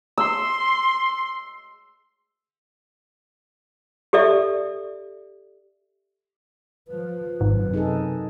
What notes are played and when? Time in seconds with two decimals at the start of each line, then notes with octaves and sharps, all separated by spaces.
0.18 C6 E6
4.13 G4 A4 D5 E5
6.88 F3 B4
7.41 G#1 F#2 C3
7.74 D#4 G#4 A4